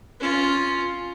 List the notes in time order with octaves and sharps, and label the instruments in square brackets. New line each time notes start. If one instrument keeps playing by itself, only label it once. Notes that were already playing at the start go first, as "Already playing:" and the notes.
[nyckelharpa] C#4 F4